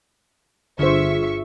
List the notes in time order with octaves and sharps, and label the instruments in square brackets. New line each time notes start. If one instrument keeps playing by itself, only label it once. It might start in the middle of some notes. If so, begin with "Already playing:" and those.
[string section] G1 E5 C#6 [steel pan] D3 C5 [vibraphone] F4 G#4